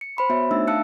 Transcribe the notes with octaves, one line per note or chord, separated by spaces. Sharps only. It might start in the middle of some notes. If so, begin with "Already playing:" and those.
C#7
C5 B5 C6
B3 F#4 C5 C#5 E5
A3 D4 D#4 E5 E6
F5 A5 E6 F#6 C#7